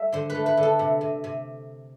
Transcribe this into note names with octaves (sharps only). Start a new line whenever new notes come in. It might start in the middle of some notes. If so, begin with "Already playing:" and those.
Already playing: G3 A3 E5
D3 C5
B4
A3
B4
D3
A4
C3
C3
C3